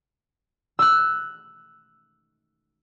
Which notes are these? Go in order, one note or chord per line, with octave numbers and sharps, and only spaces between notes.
E6 F#6